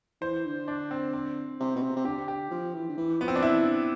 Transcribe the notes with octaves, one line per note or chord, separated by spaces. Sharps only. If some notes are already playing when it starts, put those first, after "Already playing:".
E3 C5
D3
D4
C4
C4
C3
B2
C3
C3
D3 G4
G4
F3
E3
D3
E3
F3 B3
C4
D4
E3 E4
D3